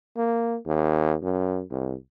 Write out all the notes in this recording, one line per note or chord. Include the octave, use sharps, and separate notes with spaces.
A#3
D#2
F#2
C2